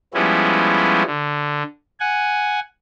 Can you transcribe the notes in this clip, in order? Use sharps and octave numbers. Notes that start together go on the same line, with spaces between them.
F3 G3 G#3 B3 C#4 E4
D3
F#5 G#5